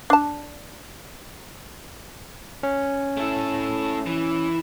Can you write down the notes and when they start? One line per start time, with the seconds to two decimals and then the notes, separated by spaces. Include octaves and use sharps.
0.10 D4 A5
2.63 C#4
3.17 A3 E4
4.06 E3